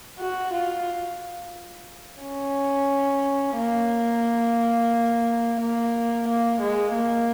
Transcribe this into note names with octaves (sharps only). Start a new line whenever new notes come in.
F#4
F4
C#4
A#3
A#3
A#3
G#3
A#3